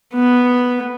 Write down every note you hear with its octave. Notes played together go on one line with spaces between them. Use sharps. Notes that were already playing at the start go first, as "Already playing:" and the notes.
B3